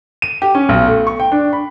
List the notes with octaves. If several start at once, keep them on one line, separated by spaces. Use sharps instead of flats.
D#7
G4
C#4
B1
A3
C#6
G5
D4
B5